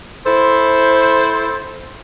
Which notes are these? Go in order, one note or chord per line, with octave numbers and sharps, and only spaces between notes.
E4 A4 C5